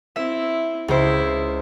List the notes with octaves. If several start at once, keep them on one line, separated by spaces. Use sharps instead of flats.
C4 E4 E5
C#2 E4 C5